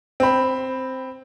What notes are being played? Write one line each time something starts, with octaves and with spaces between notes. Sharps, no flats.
C4 B5